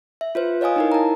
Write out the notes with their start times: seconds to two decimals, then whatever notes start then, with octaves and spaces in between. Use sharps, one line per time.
0.21 E5
0.35 F4 B4 C5
0.61 C#5 D#5 F5 G#5 D#6
0.76 D#4 E4 A#4
0.92 A5 A#5